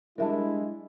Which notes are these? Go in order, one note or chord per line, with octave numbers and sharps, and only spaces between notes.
G3 G#3 D4 E4 A#4 E5 A5